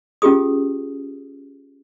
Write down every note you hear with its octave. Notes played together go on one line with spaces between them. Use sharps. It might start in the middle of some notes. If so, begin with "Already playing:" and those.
C#4 F4 G4 G#4 D#6